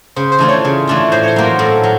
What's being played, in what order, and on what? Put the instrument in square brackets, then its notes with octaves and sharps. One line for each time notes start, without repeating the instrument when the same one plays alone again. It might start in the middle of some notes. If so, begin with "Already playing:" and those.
[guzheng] C#3 [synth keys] C5
[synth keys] C5
[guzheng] E3 A3 D4 F4
[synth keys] C#5
[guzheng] C#3
E3 A3 D4 F4
[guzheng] A2 [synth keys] C5
[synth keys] C#5
C5
[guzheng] F#3 A#3
[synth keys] A#4
[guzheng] A2 [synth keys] A4
[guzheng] F#3